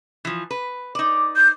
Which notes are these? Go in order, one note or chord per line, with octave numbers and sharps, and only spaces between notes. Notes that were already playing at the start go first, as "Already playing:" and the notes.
E3 F3
B4
D#4 D5
G6